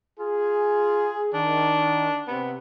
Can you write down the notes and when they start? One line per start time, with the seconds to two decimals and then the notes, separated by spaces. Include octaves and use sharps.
0.19 F4 G#4
1.33 D#3 D4
2.28 C3 B3